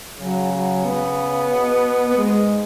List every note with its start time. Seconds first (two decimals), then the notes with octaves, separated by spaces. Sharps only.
0.18 C#3 F#3
0.51 F#3
0.84 B3
1.51 B2
2.08 B3
2.17 G#2 G#3